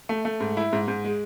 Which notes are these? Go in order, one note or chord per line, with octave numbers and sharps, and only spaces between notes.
A3
A3
G#2
E4
G#2
G#2
G#3